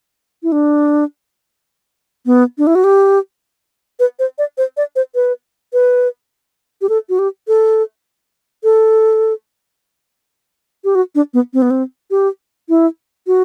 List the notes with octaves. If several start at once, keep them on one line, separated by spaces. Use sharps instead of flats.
E4
D4
B3
D4
E4
F#4
G4
B4
C5
D5
C5
D5
C5
B4
B4
G4
A4
F#4
G4
A4
A4
G4
F#4
D4
B3
C4
B3
C4
G4
E4
F#4